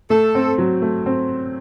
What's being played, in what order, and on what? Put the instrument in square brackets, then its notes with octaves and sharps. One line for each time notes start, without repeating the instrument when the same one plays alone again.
[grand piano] A3 [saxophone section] A4
[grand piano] C4
F#3
A3
C4